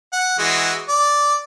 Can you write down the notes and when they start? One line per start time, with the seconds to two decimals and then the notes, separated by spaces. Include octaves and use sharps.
0.13 F#5
0.39 E3 G#3 F#4
0.89 D5